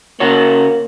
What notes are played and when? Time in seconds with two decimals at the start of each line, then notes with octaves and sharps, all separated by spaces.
0.20 C#3 A#3 F#4 C#5